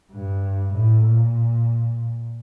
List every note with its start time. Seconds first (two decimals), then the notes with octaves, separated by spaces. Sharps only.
0.12 G2
0.74 A2
1.05 A#2